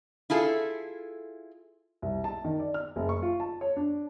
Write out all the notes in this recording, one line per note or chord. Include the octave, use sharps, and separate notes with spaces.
E4 F4 G#4 A4
C2
A5
D#3
D5
F6
F#1
C#6
F4
A5
C#5
D4